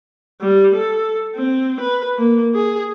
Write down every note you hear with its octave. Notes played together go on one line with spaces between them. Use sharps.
G3
A4
C4
B4
A#3
G#4